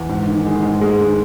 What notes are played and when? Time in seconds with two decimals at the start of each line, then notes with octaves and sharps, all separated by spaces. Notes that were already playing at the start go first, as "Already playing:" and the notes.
Already playing: E2
0.09 G#2
0.27 D#3
0.46 G#3
0.63 G#2
0.81 G#2 G#3
1.00 D#3